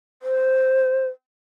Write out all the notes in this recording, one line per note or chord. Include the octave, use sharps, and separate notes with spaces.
C5